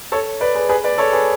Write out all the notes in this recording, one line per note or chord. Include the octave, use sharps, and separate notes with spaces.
A4 C#5
B4 D5
G#4 B4
G#4 B4
B4 D5
A4 C#5
G#4 B4